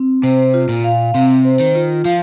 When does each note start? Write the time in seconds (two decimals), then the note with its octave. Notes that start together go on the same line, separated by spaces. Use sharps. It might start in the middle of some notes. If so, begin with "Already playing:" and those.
Already playing: C4
0.23 C3 C5
0.54 F4
0.69 A#2
0.84 F5
1.14 C3 C4
1.45 C5
1.60 D#3
1.75 F4
2.05 F3 F5